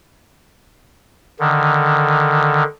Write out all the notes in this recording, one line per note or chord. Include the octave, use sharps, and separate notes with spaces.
D3 D#3